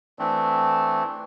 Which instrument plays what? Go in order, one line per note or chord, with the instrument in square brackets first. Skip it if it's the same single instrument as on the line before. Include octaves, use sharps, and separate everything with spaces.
[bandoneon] E3 A3 C4 D4